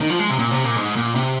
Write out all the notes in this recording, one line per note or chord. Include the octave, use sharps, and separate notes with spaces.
D#3
F3
G#3
C3
A#2
C3
A#2
G#2
A#2
C3